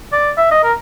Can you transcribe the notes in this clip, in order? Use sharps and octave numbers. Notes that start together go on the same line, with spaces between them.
D5
E5
D#5
A#4